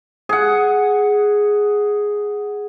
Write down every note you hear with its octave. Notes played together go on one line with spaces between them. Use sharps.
G#4 F#5